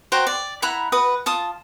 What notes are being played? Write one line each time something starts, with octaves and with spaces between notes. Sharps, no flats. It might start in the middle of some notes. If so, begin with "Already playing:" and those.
F#4 C5 G5 A#5
D5
E4 F#5 A#5 B5
F#4 B4 D#6
F4 A5 D#6